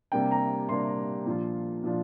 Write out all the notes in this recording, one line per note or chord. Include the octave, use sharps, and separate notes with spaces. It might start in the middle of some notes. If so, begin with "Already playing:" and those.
C3 G3 A#3 D4 G5
A#5
C3 G3 A#3 D4 C6
A#2 F3 D4 F4
A#2 F3 D4 F4